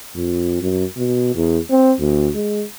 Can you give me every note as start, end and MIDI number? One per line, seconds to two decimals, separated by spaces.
0.15 0.61 41
0.62 0.85 42
0.97 1.34 47
1.35 1.59 40
1.70 1.93 60
2.00 2.29 38
2.35 2.63 56